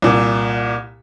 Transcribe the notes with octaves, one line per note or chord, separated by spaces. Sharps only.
C2 A#2